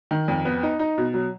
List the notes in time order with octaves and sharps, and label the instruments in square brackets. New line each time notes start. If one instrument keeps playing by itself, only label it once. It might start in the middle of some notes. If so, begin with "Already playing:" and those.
[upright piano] D#3
F2
B3
D#4
D#4
B2
F#3